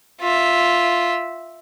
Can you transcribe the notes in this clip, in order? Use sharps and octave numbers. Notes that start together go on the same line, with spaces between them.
F4 E5